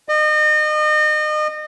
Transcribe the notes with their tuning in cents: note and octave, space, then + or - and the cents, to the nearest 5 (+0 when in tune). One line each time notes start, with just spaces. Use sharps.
D#5 -35